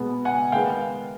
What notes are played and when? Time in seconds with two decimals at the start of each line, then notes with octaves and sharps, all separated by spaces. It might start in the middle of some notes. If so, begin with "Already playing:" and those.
Already playing: B2 G#3 B3
0.25 F#5 G#5
0.52 D#3 G#3 B3 F5 G5